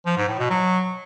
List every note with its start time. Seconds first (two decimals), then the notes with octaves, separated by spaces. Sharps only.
0.06 F3
0.17 G#2
0.28 A2
0.39 B2
0.50 F#3